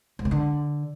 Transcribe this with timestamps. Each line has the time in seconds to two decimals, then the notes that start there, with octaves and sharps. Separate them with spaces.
0.19 G#2
0.25 C3
0.31 D3